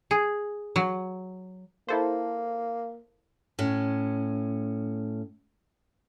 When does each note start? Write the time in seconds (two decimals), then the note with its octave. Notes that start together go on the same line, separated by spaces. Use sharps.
0.11 G#4
0.76 F#3
1.89 A#3 E4 A4 C5
3.59 A2 C#4